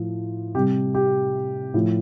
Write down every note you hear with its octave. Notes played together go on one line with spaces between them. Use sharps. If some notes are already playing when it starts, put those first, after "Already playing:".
Already playing: A2 F3
C3 G3 G4
G4
A2 F3